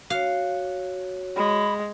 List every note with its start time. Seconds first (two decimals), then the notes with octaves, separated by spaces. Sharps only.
0.10 F#4 C#5 F5
1.36 G#3 B5